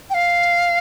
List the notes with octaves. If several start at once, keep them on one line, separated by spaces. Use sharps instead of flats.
G5
F5